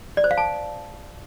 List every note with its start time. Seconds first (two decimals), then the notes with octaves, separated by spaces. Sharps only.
0.17 D5
0.24 C5
0.31 F5
0.38 A5